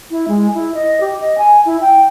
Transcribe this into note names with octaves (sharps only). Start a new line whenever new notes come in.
E4
G#3
E4
D#5
G4
D#5
G#5
E4
G5